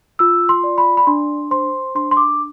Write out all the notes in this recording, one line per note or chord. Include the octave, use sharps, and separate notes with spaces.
F4 E6
C6
D5
B5
B5
D4 C6
C5 C6
D4 C6
C6
D6